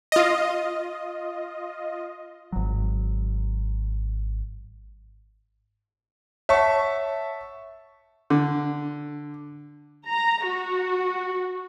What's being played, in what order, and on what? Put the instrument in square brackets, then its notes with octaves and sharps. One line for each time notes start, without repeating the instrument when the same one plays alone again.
[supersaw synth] F4 D#5
[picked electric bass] G#1 F#3
[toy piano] C#5 F#5 [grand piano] E5 A5 C#6
[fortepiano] D3
[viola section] A#5
F#4